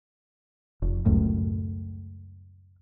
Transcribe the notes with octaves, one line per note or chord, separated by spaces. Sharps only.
F1
C#2 F#2 A2